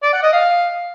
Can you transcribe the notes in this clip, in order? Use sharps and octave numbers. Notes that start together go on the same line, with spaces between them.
D5
F#5
D#5
F5